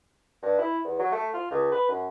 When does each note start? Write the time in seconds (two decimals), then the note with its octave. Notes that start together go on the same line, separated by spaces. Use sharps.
0.42 G2
0.59 E4
0.84 E2
0.99 F#3
1.12 A3
1.33 F4
1.50 C#2
1.72 B4
1.88 F#2